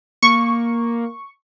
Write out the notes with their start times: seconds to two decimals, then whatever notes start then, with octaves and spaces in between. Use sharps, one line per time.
0.23 A#3 C#6